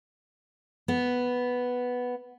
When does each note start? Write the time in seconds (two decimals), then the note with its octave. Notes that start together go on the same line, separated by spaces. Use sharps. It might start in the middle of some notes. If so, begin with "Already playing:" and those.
0.88 B3